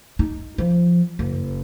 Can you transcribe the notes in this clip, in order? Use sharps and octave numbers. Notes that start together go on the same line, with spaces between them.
D#4
F3
F#1